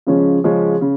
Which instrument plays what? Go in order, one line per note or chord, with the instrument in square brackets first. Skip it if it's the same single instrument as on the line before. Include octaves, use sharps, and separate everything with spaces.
[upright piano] C#3 F3 G#3 C#4
C#3 F3 G#3 C#4
C#3